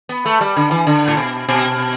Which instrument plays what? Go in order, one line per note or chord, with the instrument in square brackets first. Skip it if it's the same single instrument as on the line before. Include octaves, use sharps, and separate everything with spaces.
[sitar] B3
A3
G3
D3
E3
D3
A2
B2
B2